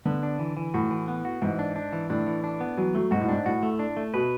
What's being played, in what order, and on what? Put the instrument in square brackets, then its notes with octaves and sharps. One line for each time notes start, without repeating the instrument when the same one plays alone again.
[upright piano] D3 [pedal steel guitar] B3
[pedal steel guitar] D4
E3
E3
[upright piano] A2 [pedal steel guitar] F#4
[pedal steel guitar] E3
B3
F#4
[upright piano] G#2 [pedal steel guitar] E3
[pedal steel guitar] D4
D4
E3
[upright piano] A2 [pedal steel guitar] D4
[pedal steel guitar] E3
D4
B3
[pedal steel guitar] E3 [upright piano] F#3
[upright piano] F#3 [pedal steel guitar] A3
[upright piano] G#2 [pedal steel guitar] F#4
[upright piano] A2
[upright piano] G#2 [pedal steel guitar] D4
[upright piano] A2 [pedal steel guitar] F#4
[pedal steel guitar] A3
D4
A3
[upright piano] B2 [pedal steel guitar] B4